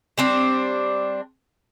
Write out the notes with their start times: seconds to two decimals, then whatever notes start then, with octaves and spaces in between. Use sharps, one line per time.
0.18 G3 C4 D4